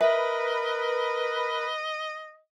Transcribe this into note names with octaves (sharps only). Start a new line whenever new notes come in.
A#4 B4 D#5 E5